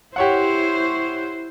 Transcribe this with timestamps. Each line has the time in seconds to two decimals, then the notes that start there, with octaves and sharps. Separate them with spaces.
0.16 E4 G4 C5 C#5 F#5